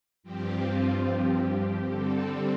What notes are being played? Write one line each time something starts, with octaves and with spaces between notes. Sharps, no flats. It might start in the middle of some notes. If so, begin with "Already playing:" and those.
G2 F3 C4 G4
F4
G4
D3 G3 C4 A4